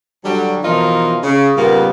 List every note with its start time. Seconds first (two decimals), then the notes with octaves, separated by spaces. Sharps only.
0.25 D3 F#3 G3
0.63 B2 E3 F3 A#3 D#4 F4
1.23 C#3
1.57 A#2 C#3 G3 A#3 B3